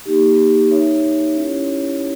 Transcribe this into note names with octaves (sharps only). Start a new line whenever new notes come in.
A#3 D#4 G4
D#4 A#4 C#5 E5
C#4 E4 G4 A#4 C#5